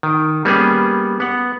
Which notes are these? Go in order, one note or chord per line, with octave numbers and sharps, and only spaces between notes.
D#3
G3 A#3 B3 C#4 G#4
B3 F#5